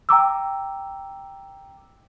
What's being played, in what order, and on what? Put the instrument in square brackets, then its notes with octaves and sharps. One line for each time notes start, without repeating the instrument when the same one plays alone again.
[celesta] G5 A#5 D6 E6